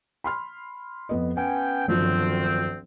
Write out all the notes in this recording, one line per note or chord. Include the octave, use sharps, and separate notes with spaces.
B5 C6 F6
F2 B3 D#5
B3 C#4 G5 G#5
G1 D2 D#3 F3 F#3 C4